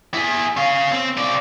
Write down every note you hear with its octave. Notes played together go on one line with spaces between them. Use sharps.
E4 G#4
C#4 F5
C4
C4 D5